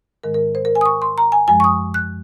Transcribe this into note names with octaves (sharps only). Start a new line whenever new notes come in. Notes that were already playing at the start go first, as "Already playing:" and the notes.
G#2 D#3 G#3 A#4
A#4
C5
A#4
G#5
D#6
C#6
C6
A#5
G#5
F#2 F3 G#3 G#5
C#6
D#6
F#6